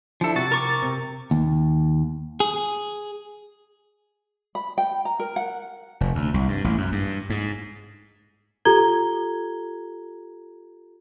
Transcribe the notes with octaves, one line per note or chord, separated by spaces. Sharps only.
F3 D4 E4 A4
C3 F#4 A6
A#4 C#6 D6
C3
D#2
G#4
B5
G5
A#5
A#4
F#5
F1
D2
C2
G2
A1
F#2
G2
G#2
F4 G4 A4 A#5 G#6 G7